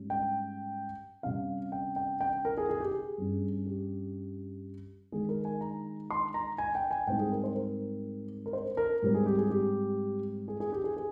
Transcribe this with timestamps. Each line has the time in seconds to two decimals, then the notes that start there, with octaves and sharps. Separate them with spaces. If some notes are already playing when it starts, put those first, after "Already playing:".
Already playing: G#2 G3 C#4
0.10 G5
1.23 C3 G3 C#4 F5
1.72 G5
1.96 G5
2.21 G5
2.45 A#4
2.57 G#4
2.69 G#4
2.80 G4
2.91 G#4
3.18 G2 G3 C#4
3.66 G4
5.12 D#3 G#3 D#4 G#4
5.29 A#4
5.45 G#5
5.61 A#5
6.10 C6
6.34 A#5
6.58 G#5
6.75 G5
6.91 G#5
7.07 G#2 G3 C4 D#4 G5
7.19 G#4
7.32 A#4
7.44 C5
7.56 A#4
8.46 A#4
8.53 C5
8.77 A#4
9.02 G#2 G3 C4
9.14 G#4
9.26 G4
9.38 G#4
9.50 G4
10.48 G#4
10.60 G#4
10.72 G4
10.84 G#4
10.96 G#4